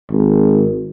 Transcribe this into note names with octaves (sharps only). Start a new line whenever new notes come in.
G#1